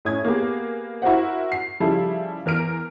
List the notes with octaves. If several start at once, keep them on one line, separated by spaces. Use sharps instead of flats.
A2 C#4 D#6 G#6
A#3 B3 G4 G#4
E4 F#4 A#4 C5 F#5
C7
C#3 F3 G3 E4 G#4 A4
E2 A#4 F6 D7